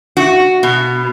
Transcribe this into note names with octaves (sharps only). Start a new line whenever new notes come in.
F#4
B2